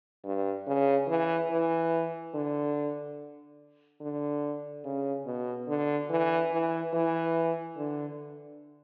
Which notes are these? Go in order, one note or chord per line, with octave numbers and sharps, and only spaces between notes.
G2
C#3
E3
E3
D3
D3
C#3
B2
D3
E3
E3
E3
D3